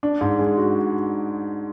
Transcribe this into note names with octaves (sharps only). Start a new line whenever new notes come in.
D4
G#2
G#3
F#4